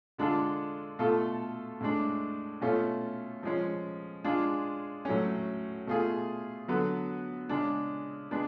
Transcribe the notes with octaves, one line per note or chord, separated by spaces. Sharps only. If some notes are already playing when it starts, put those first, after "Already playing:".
D3 G#3 D4 F4 A4
B2 A3 F4 A4
A2 G#3 D4
B2 A3 C#4 F4
F3 G#3 C#4
G#3 D4 F4 G#4
A2 F#3 A3 C#4
B2 A3 F4 G#4
D3 F#3 B3
C#3 G#3 D4
G#3 B3 D4